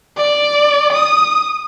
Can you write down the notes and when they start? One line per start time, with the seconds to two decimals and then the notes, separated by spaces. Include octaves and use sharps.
0.17 D5
0.93 D#6